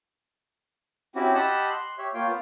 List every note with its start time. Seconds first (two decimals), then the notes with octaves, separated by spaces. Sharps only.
1.15 C4 C#4 E4 F#4 G4
1.35 G4 D#5 F#5 A5 B5 E6
1.70 C6 F#6
1.98 G4 C#5 E5
2.14 A#3 F4 C#5 G5 C6
2.28 B3 F4